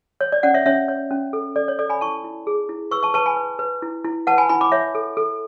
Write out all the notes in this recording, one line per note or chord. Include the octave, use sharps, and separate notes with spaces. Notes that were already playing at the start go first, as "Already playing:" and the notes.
C#5
D5
C#4 D5 F#5
C#5 E5
C#4 C#5 E5
C#5
C#4
A4
A4 D5
C#5
A4 D5
G#5 B5
E4 A5 C#6
E4
G#4
E4
B4 C#6 E6
A5 C#6
B4 A5 C#6
G#5 B5
B4
B4
E4
E4
B4 F#5 A5
G#5 B5
E4 G#5 B5
B5 D6
C#5 E5
A4
A4